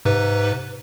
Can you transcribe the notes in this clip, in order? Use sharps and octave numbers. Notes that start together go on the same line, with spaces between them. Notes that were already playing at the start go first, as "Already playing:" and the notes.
G#2 C3 B4